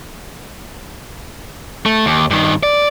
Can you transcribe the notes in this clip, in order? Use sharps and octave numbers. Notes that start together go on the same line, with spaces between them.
A3
D#2
G2 D#3
D5